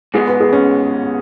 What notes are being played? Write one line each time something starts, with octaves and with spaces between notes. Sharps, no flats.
G#2 G#3 B3 G#4
B4
G#4
C#4